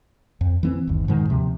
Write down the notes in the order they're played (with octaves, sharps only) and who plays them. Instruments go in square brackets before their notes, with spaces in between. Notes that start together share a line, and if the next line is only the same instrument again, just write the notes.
[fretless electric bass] F2
E3 B3 C4
G1 D#2
G#2 B2 D#3 G#3
D#2 C3 F3